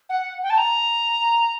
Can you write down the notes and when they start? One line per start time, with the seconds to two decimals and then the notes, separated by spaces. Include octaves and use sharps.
0.09 F#5
0.43 G5
0.50 A5
0.58 A#5